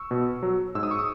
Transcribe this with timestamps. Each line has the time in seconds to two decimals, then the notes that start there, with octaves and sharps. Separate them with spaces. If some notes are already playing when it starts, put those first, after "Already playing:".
Already playing: C#6 E6
0.11 B2
0.43 F#3
0.75 G#2 E6
0.83 D#6
0.91 C#6
0.99 D#6